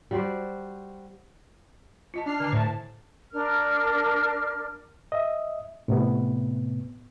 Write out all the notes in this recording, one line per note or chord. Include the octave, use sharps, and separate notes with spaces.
G3 F#4 C5 D5
F4 D#5 A5
D4 F6 C7
D3 G#5 A#5
A2 C5 E5 A5
D4 A#4 F6
D#5 E5
A2 C3 B3